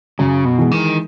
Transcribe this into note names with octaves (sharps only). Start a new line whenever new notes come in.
F#2 C#3
B2
E3 G#3
D#3